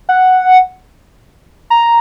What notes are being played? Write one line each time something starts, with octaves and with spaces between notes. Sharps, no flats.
F#5
A#5